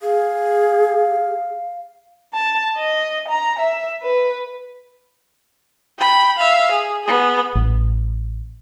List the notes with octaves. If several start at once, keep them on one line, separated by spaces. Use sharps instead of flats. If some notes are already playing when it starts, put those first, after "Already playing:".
G#4 F5
A5
D#5
A#5
E5
B4
G5 B5
E5 F5
G#4
B3 G#4
A1